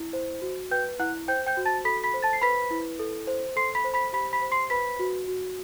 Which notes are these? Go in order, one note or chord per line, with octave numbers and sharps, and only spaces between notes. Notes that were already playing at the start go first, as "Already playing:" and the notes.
Already playing: E4
C5
F#4
B4 G5 G6
E4 F#5 F#6
C5 G5 G6
G5 G6
F#4
A5 A6
A4 B5 B6
B5 B6
C5
A5 A6
C7
B4 B5 B6
E4
A4
C5
A4 C6 C7
B5 B6
C5
B5 B6
G4 B5 B6
B5 B6
C5
C6 C7
B4 B5 B6
F#4
F#4